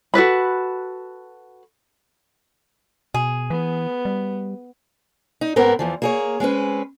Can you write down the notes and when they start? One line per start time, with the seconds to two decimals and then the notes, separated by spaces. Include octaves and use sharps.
0.14 F#4 A4 B4 B5
3.14 B2 G#4
3.50 E3 B3
4.05 G3
5.41 D#4
5.56 G#2 B3 C4 A#4
5.79 E2 E3 F3
6.02 A#3 G#4 C#5
6.40 G#3 C4 C#4 B4